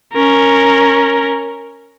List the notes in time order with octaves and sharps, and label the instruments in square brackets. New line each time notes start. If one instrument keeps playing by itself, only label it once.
[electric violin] C#4 A#4